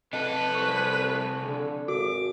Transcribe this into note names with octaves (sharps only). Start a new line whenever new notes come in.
C3 A4 B4 D#5
C2 C#6
D3
G#1 F#4 D6